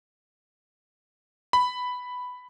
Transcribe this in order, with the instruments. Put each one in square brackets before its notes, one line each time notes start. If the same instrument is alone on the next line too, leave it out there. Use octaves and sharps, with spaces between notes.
[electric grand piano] B5